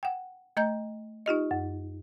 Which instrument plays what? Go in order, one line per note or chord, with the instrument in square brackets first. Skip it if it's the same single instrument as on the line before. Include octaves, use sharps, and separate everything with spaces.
[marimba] F#5 G5
A3 D#5 A#5 G6
D#4 F4 G4 D#5
F#2